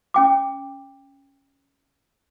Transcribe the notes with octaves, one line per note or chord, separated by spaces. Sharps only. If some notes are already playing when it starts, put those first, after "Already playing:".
C#4 G5 D6